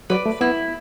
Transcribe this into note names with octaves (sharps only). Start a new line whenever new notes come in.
F#3 B4 D5
A3
B3 E4